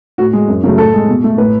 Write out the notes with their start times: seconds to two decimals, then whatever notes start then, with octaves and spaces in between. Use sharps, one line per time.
0.18 A2 F#4
0.33 G#3
0.48 F#2
0.63 C#3 F#3 A3
0.78 A2 A4
0.93 G#3
1.09 B2
1.24 A3
1.38 A2 B4